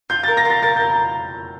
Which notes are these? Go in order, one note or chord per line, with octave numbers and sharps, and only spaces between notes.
F4 G6
A#4 A6
A#6
F4
A6
A#4 A6
F4 G6
A#5